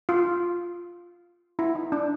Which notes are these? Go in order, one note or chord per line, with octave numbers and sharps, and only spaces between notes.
F4
E4
D#4
D4